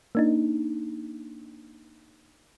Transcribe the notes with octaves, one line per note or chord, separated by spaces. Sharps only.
A#3 D4 D#4